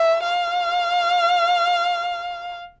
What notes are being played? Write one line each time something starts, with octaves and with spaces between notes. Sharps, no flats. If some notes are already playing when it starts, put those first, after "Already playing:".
Already playing: E5
F5